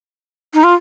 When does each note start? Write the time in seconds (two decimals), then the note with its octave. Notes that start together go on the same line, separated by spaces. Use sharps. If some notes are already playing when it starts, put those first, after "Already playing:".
0.54 D#4
0.64 F4